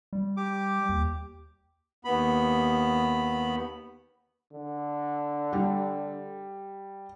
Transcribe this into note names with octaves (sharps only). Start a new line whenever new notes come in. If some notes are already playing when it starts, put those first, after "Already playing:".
G3
G4 D6
D#2
D#2 B3 B5
D3
G3